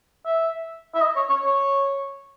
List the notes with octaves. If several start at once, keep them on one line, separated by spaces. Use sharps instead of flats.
E5
E5
D#5
C#5
C#5
C#5